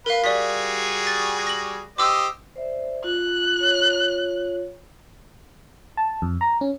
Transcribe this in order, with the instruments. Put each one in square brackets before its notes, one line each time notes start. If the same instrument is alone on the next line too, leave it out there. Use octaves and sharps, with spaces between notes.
[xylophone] A#4 F5 [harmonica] B4
[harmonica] G3 F#4 G#4 [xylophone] D5 B6
[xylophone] A6
A#6 F#7
[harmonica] G4 C5 D#5 [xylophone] D6 E6
[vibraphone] C5 D5 E5
[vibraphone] F4 [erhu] F#6
[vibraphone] F4 C#5
[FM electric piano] A5
F2
A#5
C#4